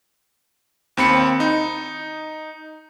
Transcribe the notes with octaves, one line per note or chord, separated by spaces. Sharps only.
D#2 C4 B5 C#7
D#4